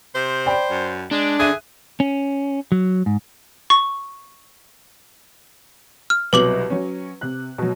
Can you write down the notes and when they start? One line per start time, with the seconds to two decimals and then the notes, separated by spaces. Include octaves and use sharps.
0.15 C3 C5
0.46 D5 G5 B5
0.70 F#2
1.11 G#3 D4
1.39 D3 G#4 E5 F#6 D#7
2.00 C#4
2.72 F#3
3.06 G#2
3.70 C#6
6.10 F6
6.33 C2 B2 F#3 B4 D6 F#7
6.70 F#3 C#4
7.21 C3 F#6
7.58 B2 F#3